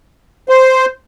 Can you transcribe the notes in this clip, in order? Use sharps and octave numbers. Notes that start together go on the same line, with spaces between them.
C5